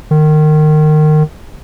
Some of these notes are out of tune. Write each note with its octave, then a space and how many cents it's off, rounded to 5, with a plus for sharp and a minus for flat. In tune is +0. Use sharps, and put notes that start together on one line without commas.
D#3 -25